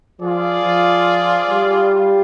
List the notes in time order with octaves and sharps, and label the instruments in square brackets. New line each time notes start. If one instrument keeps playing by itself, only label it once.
[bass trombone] F3 [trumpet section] F4 G#4 D5
[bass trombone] F3
G3
[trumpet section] F4